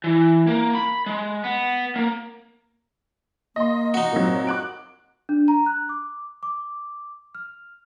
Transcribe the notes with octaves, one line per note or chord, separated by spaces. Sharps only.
E3
A#3
B5
G#3
B3
A#3
A#3 D#5 C6
D#4 F#4
A#2 F#3 C4
D6 F#6 D7
D4
A#5
F#6
D6
D6
F6